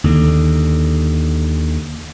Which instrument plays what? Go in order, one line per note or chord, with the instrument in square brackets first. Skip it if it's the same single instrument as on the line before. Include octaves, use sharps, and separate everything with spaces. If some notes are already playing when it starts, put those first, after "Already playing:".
[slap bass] D#2 D3